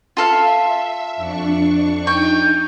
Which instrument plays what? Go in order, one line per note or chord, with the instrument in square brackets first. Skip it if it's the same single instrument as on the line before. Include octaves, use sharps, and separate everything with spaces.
[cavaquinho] F4 A4 F5 [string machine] E5
[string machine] F2 D4 C#6
[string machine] D#4 [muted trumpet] G5 [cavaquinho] C#6